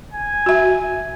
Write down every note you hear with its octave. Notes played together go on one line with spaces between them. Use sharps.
G#5
F#4 E5